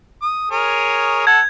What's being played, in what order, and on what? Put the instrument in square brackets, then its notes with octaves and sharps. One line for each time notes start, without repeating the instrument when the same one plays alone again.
[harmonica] D#6
G#4 A#4 C#5
[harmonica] A4 F#5 A5 [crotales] G#6